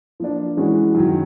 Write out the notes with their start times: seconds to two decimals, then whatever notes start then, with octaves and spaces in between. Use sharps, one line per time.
0.20 F3 A#3 D4
0.57 E3 G#3 C#4 F#4
0.95 F#2 D#3 F#3